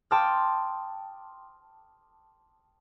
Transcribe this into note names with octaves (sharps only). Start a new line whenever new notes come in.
G5 A5 C6 D6 D#6 F6